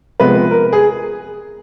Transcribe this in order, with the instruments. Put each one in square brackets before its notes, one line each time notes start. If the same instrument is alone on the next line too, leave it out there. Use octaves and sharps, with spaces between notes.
[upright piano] C3 F3 G#3 B3 B4
A#4
G#4